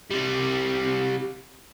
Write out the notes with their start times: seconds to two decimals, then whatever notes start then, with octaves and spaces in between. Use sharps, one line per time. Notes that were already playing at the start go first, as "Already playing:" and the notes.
0.11 C3 G3